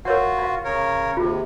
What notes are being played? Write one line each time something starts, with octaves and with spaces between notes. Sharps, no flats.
F4 F#4 A#4 C#5 F#5
F5 C6
C#3 A#4 C#5
D#2 C3 F4 G#4